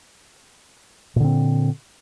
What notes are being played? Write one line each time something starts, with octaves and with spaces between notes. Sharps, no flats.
A#2 D3 C4